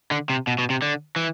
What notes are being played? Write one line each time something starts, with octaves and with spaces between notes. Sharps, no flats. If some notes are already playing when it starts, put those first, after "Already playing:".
D3
C3
B2
B2
C3
D3
E3